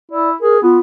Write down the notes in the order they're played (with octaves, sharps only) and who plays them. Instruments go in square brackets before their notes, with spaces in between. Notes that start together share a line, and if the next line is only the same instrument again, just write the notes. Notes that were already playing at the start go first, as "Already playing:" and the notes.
[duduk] E4 [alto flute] D5
[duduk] G#4 [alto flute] A#4
[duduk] B3 [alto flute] F4